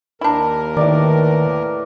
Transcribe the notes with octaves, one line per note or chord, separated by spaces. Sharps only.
D#2 D4 E4 A#4
A2 D#3 B4 D5